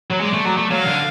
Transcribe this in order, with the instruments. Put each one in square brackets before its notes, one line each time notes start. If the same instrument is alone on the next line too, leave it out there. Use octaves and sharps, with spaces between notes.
[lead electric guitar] F#3
[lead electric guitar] G#3 [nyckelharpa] D5
[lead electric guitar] A3
F#3
A3
[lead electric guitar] F#3 [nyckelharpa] F5
[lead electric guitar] D3